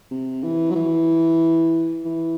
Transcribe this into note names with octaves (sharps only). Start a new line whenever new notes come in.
C3
E3
F#3
E3
E3